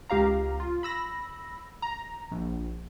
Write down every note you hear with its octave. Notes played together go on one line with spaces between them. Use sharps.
C#2 G4 F5 A#5
F4
B5 E6 A#6
A#5
A#1